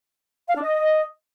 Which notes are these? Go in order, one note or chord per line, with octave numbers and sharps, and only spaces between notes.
F5
D4
D#5